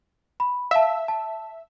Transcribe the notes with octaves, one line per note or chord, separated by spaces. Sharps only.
B5
E5 F5 A5
A5